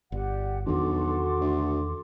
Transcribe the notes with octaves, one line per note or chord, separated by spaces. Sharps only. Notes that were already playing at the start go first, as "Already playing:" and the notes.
G1 G4 D5 F#5
B1 E2 D#3 D4 F#4 A4 C6 D6
D2